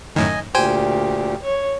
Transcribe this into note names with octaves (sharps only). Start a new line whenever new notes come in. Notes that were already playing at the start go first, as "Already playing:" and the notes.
F#2 A2 D#3 D#5 G#5
D2 A#2 G4 C5 G5 G#5
C#5